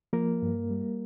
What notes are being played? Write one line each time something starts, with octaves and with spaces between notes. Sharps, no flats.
F3 A#3 A#4
G2
G3